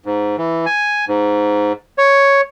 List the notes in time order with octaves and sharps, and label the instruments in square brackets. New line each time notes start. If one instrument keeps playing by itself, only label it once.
[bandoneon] G#2
E3
G#5
G#2
C#5